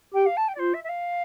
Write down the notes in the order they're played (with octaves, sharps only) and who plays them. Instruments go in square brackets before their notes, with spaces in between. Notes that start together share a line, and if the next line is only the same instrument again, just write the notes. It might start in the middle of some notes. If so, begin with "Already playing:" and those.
[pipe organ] G4 [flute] G5
[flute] F5
A5
G5
D5
[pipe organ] F4 [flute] C5
[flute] E5
E5
F5